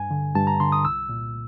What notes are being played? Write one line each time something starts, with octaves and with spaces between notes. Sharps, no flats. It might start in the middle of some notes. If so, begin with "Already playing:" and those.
Already playing: G2 G#5
D3
G2 A5
A#5
D3 C6
D#6
C2 E6
A#2